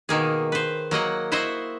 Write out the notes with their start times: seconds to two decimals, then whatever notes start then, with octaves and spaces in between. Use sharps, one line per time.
0.09 B2 D#3 A#3 G#4
0.52 B4 C5
0.91 F#3 A#3 D#5 F#5
1.32 E4 F#4 C5 D#5 E5